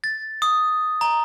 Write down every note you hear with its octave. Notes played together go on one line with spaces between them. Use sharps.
A6
D#6
A#5